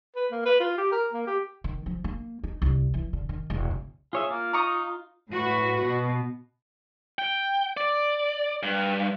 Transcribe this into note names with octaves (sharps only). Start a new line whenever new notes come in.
B4
A#3
B4
F4
G4
A#4
A#3
G4
D#3
F3
A#3
D#4
C2
E3
D3
D#3
E1
C#3
F4 G#4 C#5 E5
A#3 F4
D#4 A#5 C#6 D#6
A2 F#4 B4
B2
G5
D5
G2